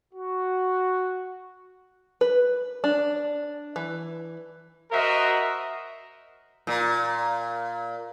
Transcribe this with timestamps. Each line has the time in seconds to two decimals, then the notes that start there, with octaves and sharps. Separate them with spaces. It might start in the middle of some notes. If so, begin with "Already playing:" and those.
0.14 F#4
2.21 B4
2.84 D4
3.76 E3
4.92 F#4 A#4 C5 D#5 E5
6.67 A#2